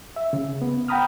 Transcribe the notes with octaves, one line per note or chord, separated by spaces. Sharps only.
E5
C#3
B3
F#5 G5 A#5 B5 D#6 F6